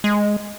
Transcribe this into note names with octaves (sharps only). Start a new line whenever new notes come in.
G#3